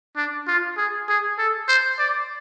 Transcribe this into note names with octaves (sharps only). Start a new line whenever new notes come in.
D4
F4
G#4
G#4
A4
C5
D5